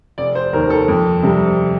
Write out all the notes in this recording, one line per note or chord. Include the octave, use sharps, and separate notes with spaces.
F1 D5
C5
D#2 D#3 A#4
A4
F2
C3 G3